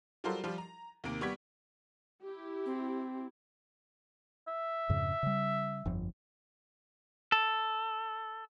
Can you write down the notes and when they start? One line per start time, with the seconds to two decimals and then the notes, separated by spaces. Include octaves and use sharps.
0.24 F#3 G3 F4 A4 A#4 C5
0.44 F3 G3 F4
0.58 A#5
1.04 D#2 C3 A#3 D7
1.21 G3 B3 C#6 G#6 B6
2.23 E4 G4
2.66 C4
4.47 E5
4.89 F2 G#2 C#3
5.23 C#3 G3
5.86 G1 F2
7.32 A4